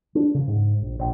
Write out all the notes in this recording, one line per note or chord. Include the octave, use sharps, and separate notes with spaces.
D4
C#3
G#2
A#1
A#1